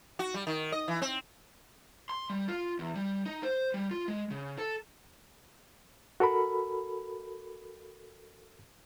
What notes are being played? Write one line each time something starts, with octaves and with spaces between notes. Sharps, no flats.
F#4
G3
D#3
D#5
E3
C4
C6
G3
F4
E2
G3
D#4
C5
G3
F4
G#3
C#3
A4
F#4 A4 A#4 B5